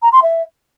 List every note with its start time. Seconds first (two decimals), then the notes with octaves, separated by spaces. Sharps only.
0.02 A#5
0.12 C6
0.22 E5